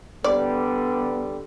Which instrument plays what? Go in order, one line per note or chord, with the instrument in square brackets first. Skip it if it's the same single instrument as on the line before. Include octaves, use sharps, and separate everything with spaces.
[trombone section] D3 G3 [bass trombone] B3 [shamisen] D5